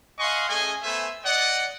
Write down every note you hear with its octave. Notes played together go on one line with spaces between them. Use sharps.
D#5 F5 F#5 G#5 C6 C#6
A3 C#4 G#4 D#5 G#5
A3 B3 C5 E5 G#5
D5 D#5 F#5